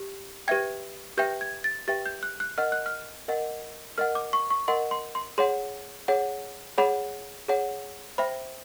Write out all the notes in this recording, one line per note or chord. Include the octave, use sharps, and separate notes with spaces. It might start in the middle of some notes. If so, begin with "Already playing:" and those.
Already playing: G4
G4 B4 E5 G5 G#6
G4 B4 E5 G5 G6
G#6
A6
G4 B4 E5 G5 A6
G6
F#6
F#6
A#4 D#5 F#5 F6
F#6
F6
A#4 D#5 F#5
A#4 D#5 F#5 F6
D6
C#6
C#6
A#4 D#5 F#5 C6
C6
C6
G#4 C#5 F#5 C6
G#4 C#5 F#5
G#4 C#5 F#5 B5
G#4 C#5 F#5
C5 E5 G5 B5